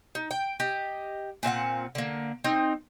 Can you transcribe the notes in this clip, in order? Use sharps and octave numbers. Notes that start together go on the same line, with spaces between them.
D#4
G5
G4 D#5
A#2 C4 F5 F#5
D3 A#3
C4 D#4